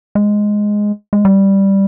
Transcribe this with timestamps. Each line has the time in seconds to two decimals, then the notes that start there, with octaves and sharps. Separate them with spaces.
0.15 G#3
1.13 G#3
1.25 G3